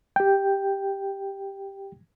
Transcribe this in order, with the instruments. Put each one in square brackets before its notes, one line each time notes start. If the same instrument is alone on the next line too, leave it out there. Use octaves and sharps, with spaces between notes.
[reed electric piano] G4 G5